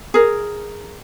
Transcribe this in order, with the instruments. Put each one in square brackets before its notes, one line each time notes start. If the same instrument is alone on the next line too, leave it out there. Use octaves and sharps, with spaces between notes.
[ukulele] G#4 A#4